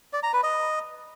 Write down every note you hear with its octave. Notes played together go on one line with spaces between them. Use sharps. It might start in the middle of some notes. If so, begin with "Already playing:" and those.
D5
A#5
B4
D#5